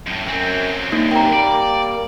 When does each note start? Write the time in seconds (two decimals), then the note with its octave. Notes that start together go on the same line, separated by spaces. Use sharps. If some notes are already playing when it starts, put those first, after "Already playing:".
0.07 F#2 A2
0.28 F#2 F#3 C4 G5 G#5
0.92 G2 A#3 D#4
1.11 C3 A#3 G5 A#5
1.33 G3 A#3 D5